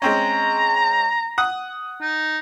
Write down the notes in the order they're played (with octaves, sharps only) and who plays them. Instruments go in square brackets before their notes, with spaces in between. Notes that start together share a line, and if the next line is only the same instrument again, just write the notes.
[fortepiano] G#3 C4 C#4 [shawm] A#5
[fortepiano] F#5 D#6
[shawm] D#4